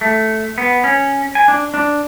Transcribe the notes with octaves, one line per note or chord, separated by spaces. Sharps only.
A3
B3
C#4
G#5
D4
D4